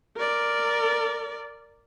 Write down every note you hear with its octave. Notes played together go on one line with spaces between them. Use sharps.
A#4 D5